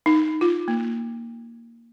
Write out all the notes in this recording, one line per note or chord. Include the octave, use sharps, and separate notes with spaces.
D#4
F4
A#3